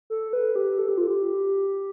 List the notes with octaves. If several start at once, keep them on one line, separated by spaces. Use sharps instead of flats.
A4
B4
G4
A4
G4
F4
G4